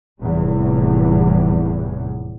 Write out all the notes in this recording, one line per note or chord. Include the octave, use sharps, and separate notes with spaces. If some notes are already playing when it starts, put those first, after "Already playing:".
F1 E2 A2 G3